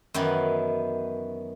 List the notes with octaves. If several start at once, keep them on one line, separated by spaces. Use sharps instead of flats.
F#2 D#3 E3 B3